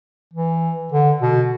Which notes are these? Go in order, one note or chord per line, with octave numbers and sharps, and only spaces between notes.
E3
D3
B2